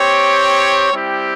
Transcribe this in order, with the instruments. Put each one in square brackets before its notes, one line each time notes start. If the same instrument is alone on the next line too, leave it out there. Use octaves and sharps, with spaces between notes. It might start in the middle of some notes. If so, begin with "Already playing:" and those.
Already playing: [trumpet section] C4 G4 C#5
G3 C4 E4 G4